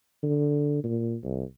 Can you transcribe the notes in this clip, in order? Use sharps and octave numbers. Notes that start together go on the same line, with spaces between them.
D3
A#2
C2